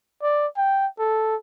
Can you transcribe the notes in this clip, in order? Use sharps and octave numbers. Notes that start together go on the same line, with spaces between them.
D5
G5
A4